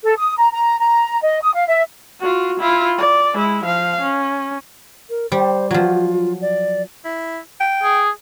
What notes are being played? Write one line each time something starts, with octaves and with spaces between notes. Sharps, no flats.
A4
D#6
A#5
A#5
A#5
D#5
D#6
F5
E5
F4 F#4
E4 F4
D5
G#3 E4
F3 F5
C#4
A#4
G3 C5
F3 F#3 F4
D5
E4
G5
G#4